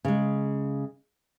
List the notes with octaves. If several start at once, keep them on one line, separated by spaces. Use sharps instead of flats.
C#3 G#3